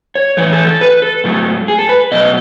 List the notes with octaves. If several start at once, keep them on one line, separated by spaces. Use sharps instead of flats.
C#5
A2 E3 A3 C#5
A4
A4
B4
A4
G#2 F#3 A3
G#4
A4
B4
B2 F#3 A3 D#5